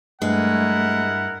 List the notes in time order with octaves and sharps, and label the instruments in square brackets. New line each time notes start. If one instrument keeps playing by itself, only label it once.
[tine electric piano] G2 [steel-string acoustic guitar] G#3 [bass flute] A3 [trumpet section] E4 A#4 F#5